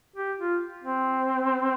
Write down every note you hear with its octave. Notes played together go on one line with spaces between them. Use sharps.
G4
F4
C4